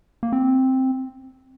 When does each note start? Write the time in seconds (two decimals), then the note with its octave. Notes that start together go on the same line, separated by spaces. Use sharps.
0.23 A#3
0.33 C4